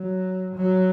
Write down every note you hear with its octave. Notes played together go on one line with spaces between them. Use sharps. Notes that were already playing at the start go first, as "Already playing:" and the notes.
Already playing: F#3
F#3